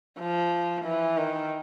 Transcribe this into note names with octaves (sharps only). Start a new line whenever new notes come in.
F3
E3
D#3